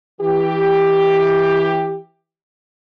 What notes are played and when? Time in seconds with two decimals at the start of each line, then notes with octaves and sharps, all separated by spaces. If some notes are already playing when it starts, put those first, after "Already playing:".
0.21 E3 G4